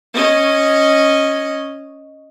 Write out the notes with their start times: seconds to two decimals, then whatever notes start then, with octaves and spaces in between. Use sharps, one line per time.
0.14 C#4 D#5